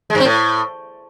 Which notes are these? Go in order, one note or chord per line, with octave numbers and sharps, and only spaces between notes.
G#3
G2
C4
A2